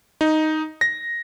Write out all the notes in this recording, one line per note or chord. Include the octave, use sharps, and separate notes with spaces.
D#4
A#6